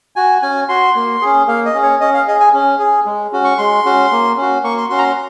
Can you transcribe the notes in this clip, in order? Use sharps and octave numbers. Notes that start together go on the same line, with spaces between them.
F#4 G#5
C#4 G#5
F#4 C6
A#3
C#4 G#4
A#3 F5
D#5
C#4 G#4
C#5
C#4 D#5
F5
G#4 D#5
G#5
C#4
G#4
G#3
C#4 F#4
C#6
G#3 C6
C#4 F#4
A#3
C#4 F#4
A#3 C#6
C6
C#4 F#4 C6
A#5
C6